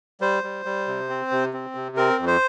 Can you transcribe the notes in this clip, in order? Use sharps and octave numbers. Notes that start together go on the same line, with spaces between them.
G3 C5
G3
G3
C3
C4
C3
C4
C3
C4 A#4
F2
C5